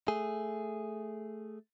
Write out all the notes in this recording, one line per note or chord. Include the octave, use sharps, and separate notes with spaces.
A3 G#4